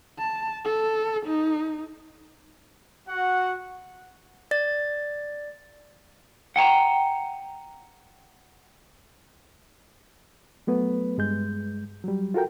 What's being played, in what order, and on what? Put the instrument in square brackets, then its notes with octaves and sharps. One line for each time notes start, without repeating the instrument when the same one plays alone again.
[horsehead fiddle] A5
A4
D#4
[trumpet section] F#4 F#5
[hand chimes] D5 A6
[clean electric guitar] F#5 G5 A5 A#5
[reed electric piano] F#3 A3 B3 B4
G2 G#3 G6
F#3 G3
F4 F#4 A4 A#4 G5